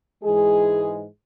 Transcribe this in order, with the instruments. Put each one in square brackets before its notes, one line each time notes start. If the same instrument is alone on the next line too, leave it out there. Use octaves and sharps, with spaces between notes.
[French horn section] G#2 E3 G#3 G#4